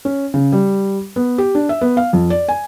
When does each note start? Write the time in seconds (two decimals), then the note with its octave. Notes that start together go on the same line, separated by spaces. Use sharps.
0.05 C#4
0.34 C#3
0.52 G3
1.16 B3
1.38 G4
1.55 D4
1.69 E5
1.81 B3
1.97 F5
2.13 F2
2.30 D5
2.48 G#5